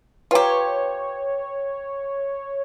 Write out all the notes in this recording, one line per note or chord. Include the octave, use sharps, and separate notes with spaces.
F4 G4 B4 C#5 G5 A#5